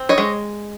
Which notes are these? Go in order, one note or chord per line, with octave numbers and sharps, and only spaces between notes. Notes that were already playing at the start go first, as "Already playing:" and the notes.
Already playing: C4
C#5 D#5
G#3